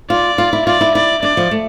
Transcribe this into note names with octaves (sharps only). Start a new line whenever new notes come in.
F4 D5
F4
E4
F4 D5
E4
E4 D5
D4 D5
F3
A3